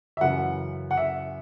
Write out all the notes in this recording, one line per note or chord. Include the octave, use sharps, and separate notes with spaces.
E5
F#2 C#3 E3 F#5
F#5
E5